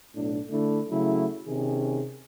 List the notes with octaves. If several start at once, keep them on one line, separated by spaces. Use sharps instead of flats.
B1 A2 D4
D3 A3 D4 E4
C#3 F#3 A3 E4
C3 D#3 C#4 G#4